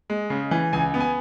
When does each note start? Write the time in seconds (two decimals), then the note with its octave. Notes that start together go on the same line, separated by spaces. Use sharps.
0.10 G#3
0.30 C#3
0.51 E3
0.73 C#2 G#5
0.94 B3
1.00 G#5